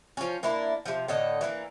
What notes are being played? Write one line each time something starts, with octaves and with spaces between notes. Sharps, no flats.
F3 C#4
A#3 D4 E4
C3 F3
A2 D3 A4 D#5
E3 A#3